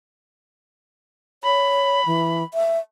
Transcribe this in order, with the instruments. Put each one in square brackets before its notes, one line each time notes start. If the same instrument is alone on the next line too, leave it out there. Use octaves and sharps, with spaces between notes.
[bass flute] C#5 [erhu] B5
[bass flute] E3
E5